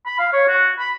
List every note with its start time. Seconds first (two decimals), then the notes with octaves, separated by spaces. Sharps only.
0.06 B5
0.19 F5
0.33 C#5
0.48 F#4
0.79 B5